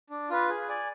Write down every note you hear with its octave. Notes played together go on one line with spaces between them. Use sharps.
D4
F4 B4
G#4
D5 G#5